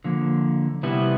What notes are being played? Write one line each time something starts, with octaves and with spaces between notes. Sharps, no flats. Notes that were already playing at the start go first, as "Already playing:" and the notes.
D3 F3 A#3
C3 E3 G3 B3 E4